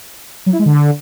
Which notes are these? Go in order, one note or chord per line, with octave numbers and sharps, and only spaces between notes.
F#3
E4
G#3
D3